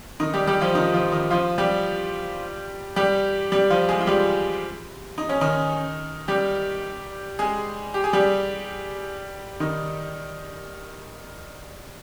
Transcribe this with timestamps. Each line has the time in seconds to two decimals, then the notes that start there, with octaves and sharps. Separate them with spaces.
0.20 D#3 D#4
0.34 G3 G4
0.47 G3 G4
0.61 F3 F4
0.75 D#3 D#4
0.94 F3 F4
1.12 D#3 D#4
1.30 F3 F4
1.58 G3 G4
2.96 G3 G4
3.52 G3 G4
3.70 F3 F4
3.89 G#3 G#4
4.00 F4
4.07 G3 G4
5.18 D#4
5.29 C#4
5.41 D#3 D#4
6.28 G3 G4
7.39 G#3 G#4
7.94 G4
8.04 G#4
8.13 G3 G4
9.60 D#3 D#4